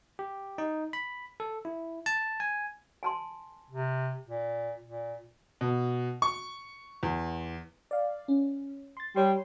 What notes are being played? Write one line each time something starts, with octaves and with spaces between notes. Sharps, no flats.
G4
D#4
B5
A4
E4
A5
G#5
G#5 A5 C6
C3
A#2
A#2
B2
C#6
E2
D5 F5
C#4
C6 A6
G3 C#5 C6